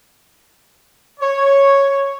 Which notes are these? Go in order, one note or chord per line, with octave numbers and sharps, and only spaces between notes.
C#5